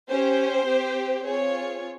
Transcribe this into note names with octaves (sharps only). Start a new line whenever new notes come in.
C#4 G4 C5
C4 G4
C4 F4 G#4 C#5